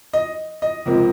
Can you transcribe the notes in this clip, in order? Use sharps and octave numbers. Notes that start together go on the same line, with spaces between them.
D#5
D#5
C#2 C3 F3 A#3